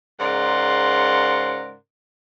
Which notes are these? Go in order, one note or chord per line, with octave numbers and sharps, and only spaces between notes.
G#2 C#3 A#4 D5 F#5 C6